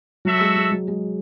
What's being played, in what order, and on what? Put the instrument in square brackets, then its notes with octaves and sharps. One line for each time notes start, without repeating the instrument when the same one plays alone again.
[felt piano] F#3 [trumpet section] F#4 A4 E5
[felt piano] G#3
G#3
F#3
G#3